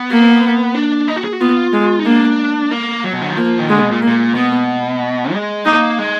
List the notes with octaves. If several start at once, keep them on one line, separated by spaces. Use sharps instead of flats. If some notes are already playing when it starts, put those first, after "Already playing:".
Already playing: B3
A#3
D4
D#4
F#4
G#4
F#4
B3 F4
G#3
D#4
A#3 D4
A#3
F#3
B2
D3
D#3
F3 A#3
D#3
D3 G#3
B2
A#2
A#3
A#2
B2 B3
G#3
A#3 D#4
G#3